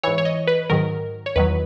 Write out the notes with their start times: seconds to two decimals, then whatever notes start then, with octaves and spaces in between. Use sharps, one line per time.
0.03 G#2 E3 C#5
0.18 C#5
0.25 D#5
0.47 B4
0.70 G#2 D#3 F#3 A#4
1.26 C#5
1.36 E2 D#3 F#3 B4